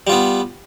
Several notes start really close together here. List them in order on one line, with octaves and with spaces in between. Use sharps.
G3 F4 B3